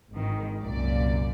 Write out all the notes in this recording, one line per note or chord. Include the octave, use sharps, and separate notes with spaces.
G#1 D#3
C2 F#2 A#2 D5